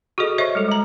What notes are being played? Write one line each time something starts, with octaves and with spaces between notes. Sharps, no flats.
F#4 G#4 A4 D#5
C5 C#5 D#5 E5 C#6
G3 G#3 A4
G#3 A#5